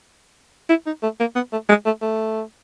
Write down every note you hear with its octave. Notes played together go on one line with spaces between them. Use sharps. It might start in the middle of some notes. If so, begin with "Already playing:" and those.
E4
D#4
A3
A#3
B3
A3
G#3
A3
A3